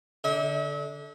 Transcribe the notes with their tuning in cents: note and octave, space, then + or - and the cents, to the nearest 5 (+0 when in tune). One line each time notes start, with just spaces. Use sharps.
D3 -15 E5 -45